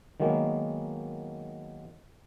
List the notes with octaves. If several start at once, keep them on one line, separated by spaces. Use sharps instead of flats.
D#3 F#3 G#3 A#3 B3